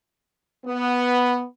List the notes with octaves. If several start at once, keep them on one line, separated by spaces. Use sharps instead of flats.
B3